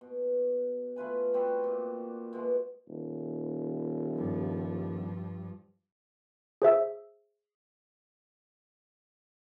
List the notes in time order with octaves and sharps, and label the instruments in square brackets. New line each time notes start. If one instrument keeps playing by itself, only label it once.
[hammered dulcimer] B2
A3 F4 B4 G#5
G3 C4 F#4 B4
A#2
B2 G#3 A3 B3
[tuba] D#1
[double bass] G2 F3
[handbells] G#4 C5 E5 E6